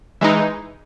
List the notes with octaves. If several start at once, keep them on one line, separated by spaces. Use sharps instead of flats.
E3 G#3 D#4